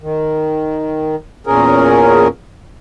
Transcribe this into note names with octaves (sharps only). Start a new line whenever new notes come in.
D#3
E2 A#2 C#4 G#4 A#4